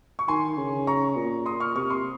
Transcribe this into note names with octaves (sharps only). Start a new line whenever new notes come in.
C#6
D#3 G#5 C6
C#3
A#5 C#6
A#2
C6 D#6
C#6 F6
C3 C#6 F6
C6 D#6